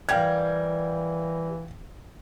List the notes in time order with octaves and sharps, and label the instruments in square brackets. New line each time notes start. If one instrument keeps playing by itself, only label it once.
[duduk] E3 [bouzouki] G3 A#3 [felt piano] F5 G5 G#6